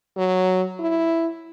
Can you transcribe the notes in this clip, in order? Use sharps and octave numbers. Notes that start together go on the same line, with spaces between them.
F#3
E4